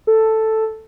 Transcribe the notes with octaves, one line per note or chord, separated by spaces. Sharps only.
A4